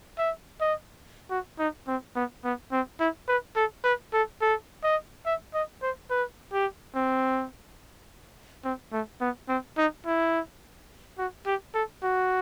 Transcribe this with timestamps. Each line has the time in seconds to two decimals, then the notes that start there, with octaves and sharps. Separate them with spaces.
0.18 E5
0.61 D#5
1.31 F#4
1.59 D#4
1.88 C4
2.16 B3
2.45 B3
2.72 C4
3.00 E4
3.28 B4
3.56 A4
3.84 B4
4.14 A4
4.41 A4
4.83 D#5
5.26 E5
5.54 D#5
5.82 C5
6.11 B4
6.53 G4
6.95 C4
8.65 C4
8.93 A3
9.21 B3
9.49 C4
9.78 D#4
10.06 E4
11.18 F#4
11.47 G4
11.75 A4
12.03 F#4